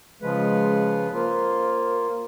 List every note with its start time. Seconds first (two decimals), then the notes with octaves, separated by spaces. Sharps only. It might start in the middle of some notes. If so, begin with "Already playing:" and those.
0.22 C#3 F3 G#3 B4
1.13 A#3 F4 A#4 C5